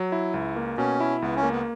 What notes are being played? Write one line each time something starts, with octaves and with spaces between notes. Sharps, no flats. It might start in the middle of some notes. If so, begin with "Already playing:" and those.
Already playing: F#3
E4
C#2
A#3
B2 C#4
E4
C#2 B3
C#4
A#3
B3